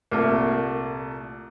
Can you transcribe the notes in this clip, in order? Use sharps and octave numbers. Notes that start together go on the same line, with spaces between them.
C2 A#2 A3 A#3